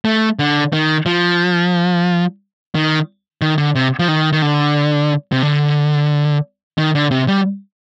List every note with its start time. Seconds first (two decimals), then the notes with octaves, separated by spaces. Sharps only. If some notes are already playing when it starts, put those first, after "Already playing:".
0.05 A3
0.39 D3
0.73 D#3
1.06 F3
2.75 D#3
3.42 D#3
3.58 D3
3.75 C3
3.99 F3
4.08 D#3
4.33 D#3
4.42 D3
5.32 C3
5.43 D3
6.78 D#3
6.95 D3
7.11 C3
7.28 G3